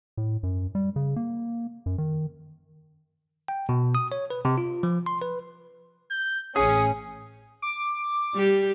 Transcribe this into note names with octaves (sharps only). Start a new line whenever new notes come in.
A2
F#2
G3
C#3
A#3
F#2
D#3
G5
B2
D#6
C#5
B4
C3
F4
F3
C6
B4
G6
A1 C#4 G#4 D#6
D6
G3 G4